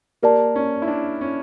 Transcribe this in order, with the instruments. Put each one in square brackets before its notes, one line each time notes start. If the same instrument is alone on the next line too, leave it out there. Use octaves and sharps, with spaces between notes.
[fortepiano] A#3 [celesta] G4 A#4 D5 A5
[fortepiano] C#4
E4
D4
C#4